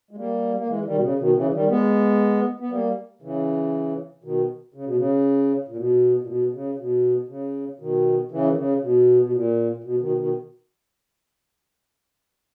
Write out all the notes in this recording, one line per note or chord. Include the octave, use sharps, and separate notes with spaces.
G#3
G3 A#3
A#3
E3 G#3
D#3 G3
B2
C#3
B2 D#3
C#3 E3
D#3 G3
G#3 B3
B3
G3 A#3
C#3 E3
B2 D#3
C#3
B2
C#3
A#2
B2
A#2
B2
C#3
B2
C#3
B2 D#3
C#3 E3
D#3
C#3
B2
B2
A#2
B2
B2 D#3
B2 D#3